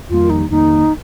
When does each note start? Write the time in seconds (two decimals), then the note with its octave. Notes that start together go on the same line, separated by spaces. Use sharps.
0.10 F2 D#3 G3 A#3 F4
0.30 D#4
0.50 F2 D#3 G3 A#3 D#4